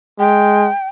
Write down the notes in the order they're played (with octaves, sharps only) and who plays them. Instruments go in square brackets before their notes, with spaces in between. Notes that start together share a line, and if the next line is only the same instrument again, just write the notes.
[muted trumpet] G#3 [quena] G5